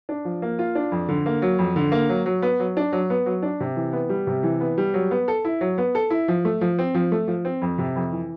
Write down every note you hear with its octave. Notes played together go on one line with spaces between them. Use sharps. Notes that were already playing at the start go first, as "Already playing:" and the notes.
D4
F3
A#3
F4
D4
F2
D3
A#3
F#3
F2
D3
A#3
F#3
F#3
B3
F#3
D4
F#3
B3
F#3
D4
C3
E3
B3
G3
C3
E3
B3
G3
F#3
B3
A4
E4
F#3
B3
A4
E4
F3
A3
F3
C4
F3
A3
F3
C4
F2
C3
F2
E3